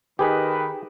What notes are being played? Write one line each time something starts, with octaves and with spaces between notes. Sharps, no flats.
D#3 G4 G#4 B4